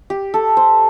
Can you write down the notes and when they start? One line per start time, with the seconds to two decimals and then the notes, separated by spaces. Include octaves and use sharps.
0.10 G4
0.34 A4
0.57 C5